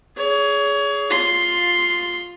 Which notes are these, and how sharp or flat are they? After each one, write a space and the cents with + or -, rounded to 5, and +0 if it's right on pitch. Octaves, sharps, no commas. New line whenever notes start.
G#4 +10 C#5 +35
F4 +10 C6 +0